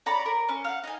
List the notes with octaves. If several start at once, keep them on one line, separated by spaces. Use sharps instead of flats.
C#5 D5 A#5 B5
A#4
C#4
F5 F#5
D#4 G#5